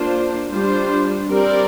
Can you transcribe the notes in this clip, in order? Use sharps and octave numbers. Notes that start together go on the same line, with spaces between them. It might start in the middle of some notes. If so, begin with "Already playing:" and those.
Already playing: A#3 D4 F4 C5
G3 D4 F4 C5
G3 C4 G4 A#4 D5